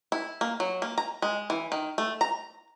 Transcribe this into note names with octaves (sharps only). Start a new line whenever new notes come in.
E4
A#3
F#3
A#3
A#5
G#3
E3
D#3
A3
A#5